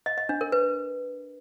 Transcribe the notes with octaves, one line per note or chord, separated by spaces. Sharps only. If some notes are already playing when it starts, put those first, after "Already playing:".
D#5
D#5
D4
A#4
B4